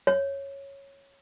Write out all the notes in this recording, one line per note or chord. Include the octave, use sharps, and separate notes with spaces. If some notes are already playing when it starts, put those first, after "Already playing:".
C#5